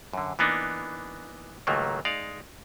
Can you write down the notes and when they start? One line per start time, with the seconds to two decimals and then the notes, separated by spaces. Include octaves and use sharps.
0.13 F#2 D3
0.39 E3 A#3 B3 D4 D#4
1.67 C#2 G#2 D#3 F#3 A3 A#3
2.05 G#3 D#4 D5 F5